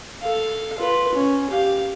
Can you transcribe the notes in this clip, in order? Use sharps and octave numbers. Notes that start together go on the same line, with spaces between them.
A4 F5
F4 B4
C#4
G4 F5